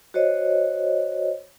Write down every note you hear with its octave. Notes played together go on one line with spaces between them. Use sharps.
F#4 C5 C#5 D#5